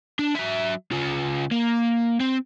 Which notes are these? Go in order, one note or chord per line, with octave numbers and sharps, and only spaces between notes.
D4
F#3 E5
C#3 F4
A#3
C4